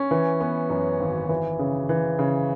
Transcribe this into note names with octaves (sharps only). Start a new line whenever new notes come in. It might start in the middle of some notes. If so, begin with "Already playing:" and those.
Already playing: C#4
E3
B3
F#2
G#1
E3
C#3
E3
C#3